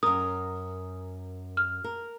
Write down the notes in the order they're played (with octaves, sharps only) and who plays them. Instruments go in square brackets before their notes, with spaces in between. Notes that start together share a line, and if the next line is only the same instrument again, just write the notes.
[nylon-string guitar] F#2 A#4 [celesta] D#6
[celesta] F6
[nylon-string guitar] A#4